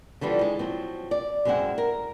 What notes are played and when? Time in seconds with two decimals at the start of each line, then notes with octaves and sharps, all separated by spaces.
0.21 D3 E3 F3 G3 D4
0.41 G#3
0.59 F3 F#3 C4
1.11 D5
1.45 F#2 F3 G#3 C4 E4 F#5
1.78 A#4